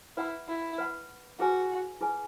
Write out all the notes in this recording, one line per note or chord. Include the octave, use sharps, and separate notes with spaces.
E4 B4 F#5 B5
E4
B4 F#5 B5
E4 F#4 G#4 B4 G#5
E4 G#4 B4 G#5